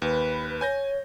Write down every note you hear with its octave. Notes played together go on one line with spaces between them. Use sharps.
D#2 B4
C#5 G#5 G6 A#6